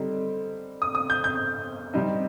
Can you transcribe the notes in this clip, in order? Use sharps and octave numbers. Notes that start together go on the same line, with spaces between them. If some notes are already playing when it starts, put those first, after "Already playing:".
Already playing: D3 G3 C4 D#4
D#6
D#6
G6
G6
C3 G3 C4 D#4